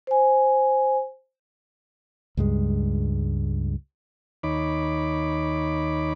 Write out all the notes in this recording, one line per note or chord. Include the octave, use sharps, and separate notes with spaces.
C5 G#5
C#2 G2 G#3
D#2 D#4 C#5 B5 D6